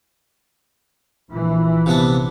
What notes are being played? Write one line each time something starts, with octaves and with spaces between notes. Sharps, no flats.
A#1 E3
C3 B3 D4